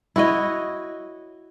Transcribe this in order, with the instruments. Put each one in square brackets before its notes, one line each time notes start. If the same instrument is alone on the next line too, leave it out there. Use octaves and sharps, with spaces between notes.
[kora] E4 F#4 C#5 D#5